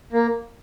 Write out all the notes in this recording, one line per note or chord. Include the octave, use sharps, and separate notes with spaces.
A#3